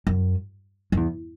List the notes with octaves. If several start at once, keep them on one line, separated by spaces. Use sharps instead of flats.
F#2
F#2
E2